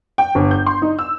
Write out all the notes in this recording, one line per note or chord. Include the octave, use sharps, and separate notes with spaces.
G5
G1
G6
C6
D#4
E6